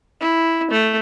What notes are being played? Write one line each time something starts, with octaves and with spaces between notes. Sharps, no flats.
E4
A3